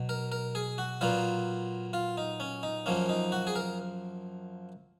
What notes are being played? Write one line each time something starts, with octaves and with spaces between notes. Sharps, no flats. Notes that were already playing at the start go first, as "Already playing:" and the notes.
Already playing: B2 F#3
A#4
A#4
G#4
F#4
A#2 F#3 B3 F4
F4
D#4
C#4
D#4
F#2 F3 A#3 C#4
D#4
F#4
G#4
A#4